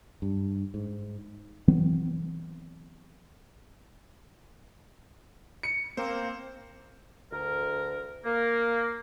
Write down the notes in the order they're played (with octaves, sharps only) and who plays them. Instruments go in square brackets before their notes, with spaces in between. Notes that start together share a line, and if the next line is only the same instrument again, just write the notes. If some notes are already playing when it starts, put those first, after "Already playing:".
[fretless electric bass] G2
G#2
E3 F#3 B3 C4
[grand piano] C#7
[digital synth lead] A#3 [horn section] C4 [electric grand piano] C5
[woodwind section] D2 A#4
A#3